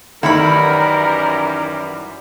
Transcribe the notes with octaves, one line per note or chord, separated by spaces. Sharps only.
F#2 D#3 E3 G3 E4 A#4 C#5 B5